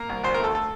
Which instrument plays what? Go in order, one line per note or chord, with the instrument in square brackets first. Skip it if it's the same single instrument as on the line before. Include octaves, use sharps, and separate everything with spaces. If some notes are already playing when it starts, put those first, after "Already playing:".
Already playing: [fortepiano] A#3 A#4
C2
D2 C5
A#4
A3 A4
A4